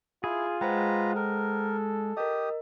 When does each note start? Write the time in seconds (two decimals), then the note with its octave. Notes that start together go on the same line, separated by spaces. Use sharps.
0.24 E4 F4 G#4
0.61 G#3 B4 C5 F#5 G5 A#5
1.16 A4 A#4
2.17 G4 A#4 D#5 D#6